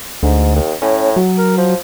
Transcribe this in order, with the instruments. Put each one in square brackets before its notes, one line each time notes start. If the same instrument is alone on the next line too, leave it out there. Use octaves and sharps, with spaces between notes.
[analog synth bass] D2 [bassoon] G#2
[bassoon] D#2
[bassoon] A2 [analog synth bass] C#4
[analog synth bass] F#3
[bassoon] A#4
F3